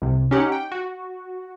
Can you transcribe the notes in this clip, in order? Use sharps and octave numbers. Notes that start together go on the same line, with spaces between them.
C2 C3
C#4 D#4 G4 F#5
G5
F#4